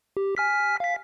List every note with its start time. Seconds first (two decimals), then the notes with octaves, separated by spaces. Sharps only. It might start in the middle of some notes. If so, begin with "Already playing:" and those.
0.17 G4
0.37 G#5 F6 B6
0.80 F5 B6